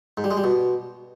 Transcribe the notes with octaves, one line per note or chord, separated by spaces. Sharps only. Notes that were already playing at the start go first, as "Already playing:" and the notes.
G#2
G3
G#3
G3
B2